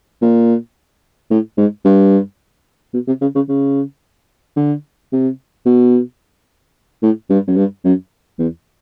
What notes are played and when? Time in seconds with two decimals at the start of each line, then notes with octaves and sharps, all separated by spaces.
0.22 A#2
1.30 A2
1.57 G#2
1.85 G2
2.94 B2
3.07 C3
3.21 C#3
3.35 C#3
3.49 C#3
4.57 D3
5.12 C3
5.66 B2
7.02 A2
7.30 G2
7.48 F#2
7.56 G2
7.84 F#2
8.39 E2